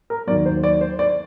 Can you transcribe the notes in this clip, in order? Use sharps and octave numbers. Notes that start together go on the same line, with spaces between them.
A#4
D#2 D#3 F#3 D5
C5
D5
C5
D5